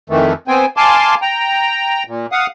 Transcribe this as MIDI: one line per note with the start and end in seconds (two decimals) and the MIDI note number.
0.10 0.33 41
0.10 0.33 51
0.10 0.33 52
0.10 0.33 57
0.48 0.66 59
0.48 0.66 60
0.48 0.66 72
0.48 0.66 79
0.48 0.66 80
0.77 1.15 77
0.77 1.15 80
0.77 1.15 81
0.77 1.15 84
0.77 1.15 86
1.22 2.03 79
1.22 2.03 82
2.07 2.26 46
2.32 2.47 77
2.32 2.47 78
2.32 2.47 87